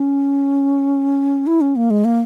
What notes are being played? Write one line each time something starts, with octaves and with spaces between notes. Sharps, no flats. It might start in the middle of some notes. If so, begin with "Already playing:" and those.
Already playing: C#4
E4
C#4
A#3
G#3
A#3